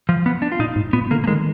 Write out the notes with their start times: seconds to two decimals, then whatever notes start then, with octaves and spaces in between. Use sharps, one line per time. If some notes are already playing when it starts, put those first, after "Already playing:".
0.09 F3
0.26 B3
0.42 D4
0.52 F4
0.60 A#2 D#4
0.76 G#2
0.93 A#2 B3
1.11 D3 A#3
1.24 A#3
1.27 D#3 G#3